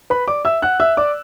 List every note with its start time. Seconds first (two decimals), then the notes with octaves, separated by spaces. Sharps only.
0.10 B4 B5
0.28 D5 D6
0.45 E5 E6
0.62 F#5 F#6
0.80 E5 E6
0.97 D5 D6